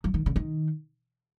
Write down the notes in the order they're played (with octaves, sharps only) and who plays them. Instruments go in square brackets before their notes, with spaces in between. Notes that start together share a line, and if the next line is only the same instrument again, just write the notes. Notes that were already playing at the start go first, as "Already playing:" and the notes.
[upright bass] F#3
D#3
C#3
D#3